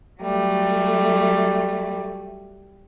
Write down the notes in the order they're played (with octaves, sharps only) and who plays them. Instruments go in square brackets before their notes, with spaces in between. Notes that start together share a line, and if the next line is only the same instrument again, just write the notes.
[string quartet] F#3 G3 A3